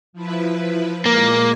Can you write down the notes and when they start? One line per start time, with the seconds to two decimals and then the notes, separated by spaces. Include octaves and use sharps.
0.13 F3 E4 B4
1.06 A#2 G#3 A#3 G#5